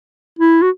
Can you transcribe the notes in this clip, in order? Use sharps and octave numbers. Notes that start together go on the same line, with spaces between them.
E4
F#4